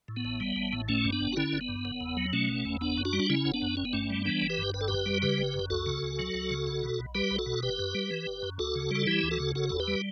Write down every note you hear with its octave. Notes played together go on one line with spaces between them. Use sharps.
A2
B3
A1
G3
A1
A2
G1 A3 C#4
G2
B3 D4
G1
F#4
D3 C#4 E4
G1
B3
G2
F#1
E2
F#3
B2 A3 C#4
F#1
E2
F#1 B3 D4
F#2
D4 F#4
G3
D4
C#3 C#4 E4
F#1
B3 D4
F#2
G1 C#4
B3
G2 A3 C#4
G3
E3 B3 D4
G1
G4 B4
G2
G1 B4
A4
F#2 G4 B4
G3
C#3 G4 B4
G1
F#2
C#2 F#4 A4
C#3
C#2
F#3
C#2
C#3
B1
B2
B1
G3 G4 B4
B1
F#4 A4
B2
G1 G4 B4
F#2
G3
E3
G1
F#2
D2 F#4 A4
C#3
G3 A4
E3 E4 G4
D2
F#4 A4
C#3
F#1 F#4 A4
E2 A4
G4 B4
G3